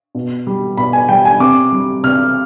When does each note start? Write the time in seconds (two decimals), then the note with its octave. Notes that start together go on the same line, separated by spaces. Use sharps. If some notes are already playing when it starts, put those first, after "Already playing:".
0.15 B2
0.47 G3
0.77 B2 B5
0.93 G#5
1.09 G3 G5
1.25 G#5
1.40 C3 D6
1.72 G3
2.03 C3 F6